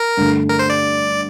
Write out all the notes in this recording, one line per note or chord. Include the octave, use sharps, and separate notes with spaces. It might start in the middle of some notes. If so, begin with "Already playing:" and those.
Already playing: A#4
G2 D3 A3
A#4
C5
D5